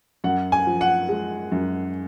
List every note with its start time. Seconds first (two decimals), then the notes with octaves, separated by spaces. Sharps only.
0.24 F#2 F#5
0.52 G#5
0.67 F3
0.81 F#5
1.09 G#3
1.52 F#2